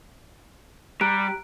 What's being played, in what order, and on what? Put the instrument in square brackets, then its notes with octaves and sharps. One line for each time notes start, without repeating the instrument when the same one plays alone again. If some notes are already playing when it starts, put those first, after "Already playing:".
[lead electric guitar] G3 [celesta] A#5 F#6 D7